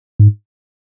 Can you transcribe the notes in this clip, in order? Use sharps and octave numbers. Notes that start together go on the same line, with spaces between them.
G#2